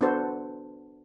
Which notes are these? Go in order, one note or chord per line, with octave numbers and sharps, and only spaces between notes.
B3 D4 F#4 A4 C5